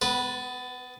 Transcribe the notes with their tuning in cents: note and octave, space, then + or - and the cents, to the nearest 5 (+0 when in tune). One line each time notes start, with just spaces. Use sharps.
B3 +25 B4 -10